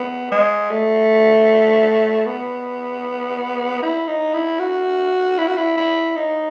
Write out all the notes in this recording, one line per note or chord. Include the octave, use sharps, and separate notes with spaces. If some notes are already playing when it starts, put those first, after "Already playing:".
Already playing: B3
G#3
A3
B3
E4
D#4
E4
F#4
E4
F#4
E4
E4
D#4